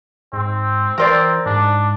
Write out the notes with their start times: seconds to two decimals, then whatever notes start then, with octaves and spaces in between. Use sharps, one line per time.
0.33 G#2 C4
0.98 E3 C4 A#4 C5 D5
1.46 G#2 D4